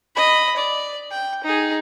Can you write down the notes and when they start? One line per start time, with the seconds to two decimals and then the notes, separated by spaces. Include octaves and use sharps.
0.16 D#5 B5
0.57 D5
1.11 G5
1.44 D#4 G#4